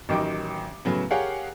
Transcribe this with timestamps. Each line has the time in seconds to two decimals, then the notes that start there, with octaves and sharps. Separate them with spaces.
0.09 A1 D#3 F#3 G5 D6
0.85 A2 C#3 F#3 B3
1.11 G4 G#4 A#4 C#5 F5 F#5